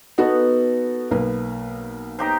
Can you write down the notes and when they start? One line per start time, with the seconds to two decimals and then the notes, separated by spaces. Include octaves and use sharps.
0.18 B3 D#4 F#4 A4
1.11 B1 A#3 B4
2.19 D#4 G4 C5